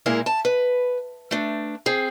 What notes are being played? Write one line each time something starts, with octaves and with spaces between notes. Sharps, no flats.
A#2 G#3 A#3 E4 A#4
A5
B4
A3 D4
C4 G#4